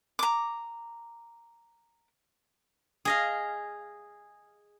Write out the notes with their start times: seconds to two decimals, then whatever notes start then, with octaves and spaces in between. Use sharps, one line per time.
0.19 A#5 D6
3.05 G#4 D#5 F5